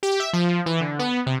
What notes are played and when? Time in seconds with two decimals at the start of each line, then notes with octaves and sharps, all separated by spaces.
0.03 G4
0.20 E5
0.33 F3
0.66 E3
0.81 D3
0.99 B3
1.26 C3